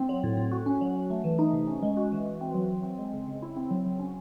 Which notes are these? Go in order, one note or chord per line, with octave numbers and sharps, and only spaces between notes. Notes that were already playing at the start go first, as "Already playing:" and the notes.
Already playing: C4
F#3
A2
A2
F#4
C#4
F#3
F#3
A3
E3
D#4
C3
C#4
G#3
F#4
E3
F#4
C4
F#3
F#3
C4
G#3
C#3
C#3
E4
C4
F#3
F#3
C#4